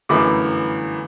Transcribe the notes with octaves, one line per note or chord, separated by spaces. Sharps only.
G1 F#2 E3 A3 B5 D6